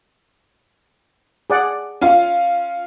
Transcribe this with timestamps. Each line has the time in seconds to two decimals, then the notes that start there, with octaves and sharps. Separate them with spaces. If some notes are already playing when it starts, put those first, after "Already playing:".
1.50 G#4 D5 F#5
2.01 C#4 F4 F5